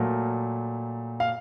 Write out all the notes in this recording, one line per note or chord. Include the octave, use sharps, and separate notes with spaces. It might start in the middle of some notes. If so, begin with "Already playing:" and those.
Already playing: A#2 F#3 A3 A#4
F5